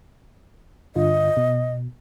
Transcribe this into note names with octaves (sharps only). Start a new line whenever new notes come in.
G2 D3 F4 D#5
B2